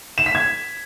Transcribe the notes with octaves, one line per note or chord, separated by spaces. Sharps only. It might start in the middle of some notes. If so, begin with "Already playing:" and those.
E7
B6
G#6